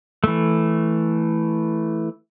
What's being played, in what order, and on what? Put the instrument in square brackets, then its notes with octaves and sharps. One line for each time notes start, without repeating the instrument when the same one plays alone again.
[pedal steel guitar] E3 A3